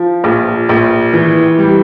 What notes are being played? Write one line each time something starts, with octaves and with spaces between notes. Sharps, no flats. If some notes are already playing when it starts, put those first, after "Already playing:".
Already playing: F3
A#1
A#1
E3
G3